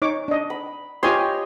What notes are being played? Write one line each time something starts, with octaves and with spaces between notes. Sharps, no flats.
D#4 C#5 D6
D4 D#5
B5
F4 G4 C#5 D#5 G#5 C6